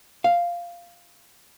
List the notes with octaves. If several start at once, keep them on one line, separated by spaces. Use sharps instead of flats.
F5